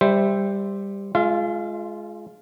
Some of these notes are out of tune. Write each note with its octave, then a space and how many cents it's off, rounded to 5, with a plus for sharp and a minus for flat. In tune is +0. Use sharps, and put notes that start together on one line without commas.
G3 +15 C5 -5 E5 +0
G#3 +25 F4 -5 F5 -45